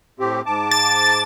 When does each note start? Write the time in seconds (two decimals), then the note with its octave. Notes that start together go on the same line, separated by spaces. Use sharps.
0.20 A2 C4 G4
0.46 G#2 A5 D6
0.71 A6